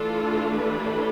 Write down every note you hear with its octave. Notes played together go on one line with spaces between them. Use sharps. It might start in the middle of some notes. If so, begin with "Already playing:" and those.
Already playing: E3 A3 D4 F4 A4
G4 B4